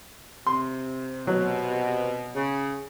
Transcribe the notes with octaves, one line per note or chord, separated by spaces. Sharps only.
C3 C6
B2 F#3
C#3